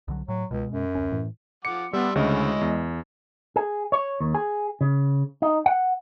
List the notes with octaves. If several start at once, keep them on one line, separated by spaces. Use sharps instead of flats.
C2 D3 F#3
A2 F#3
C#2 B2 G#3
F#2
D2 C#4
A2 E3
F3 F#5 D6 C#7
G3 B3 D4 E5 C6
D2 C#3 G#3 E4 C#5 D#5
E2
G#4
C#5
D#2
G#4
C#3
D#4
F#5